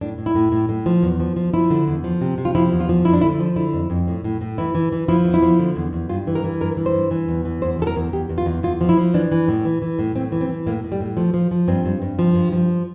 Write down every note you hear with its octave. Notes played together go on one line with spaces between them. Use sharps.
A2 D4
A2
E4
A2
A2
A2
F3
E2
F3
F3
F3 E4
D3
E2
F3
C3
C3
F4
F3 E4
E2
F4
F3
F2 E4
D4
D3 E4
F3
D3 E4
F2
F2
A2
A2
A2
E3 E4
E3
E3
F3 E4
E2
E4
F3
D3
E2
E2
G2 F4
E3
A#4
E3
G2 A#4
E3
C5
G2
E3
E2
E3
E2 C5
E2 A4
A#4
E2
E2 G4
E2
F4
E2
E2 F4
F3
E4
F3
E3 D4
E3
A2
E3
E3
A2
A2 C4
E3
C4
E3
A2 A#3
A2
G3
A2
F3 A3
F3
F3
G2 C4
G2
G2
F3
G2
F3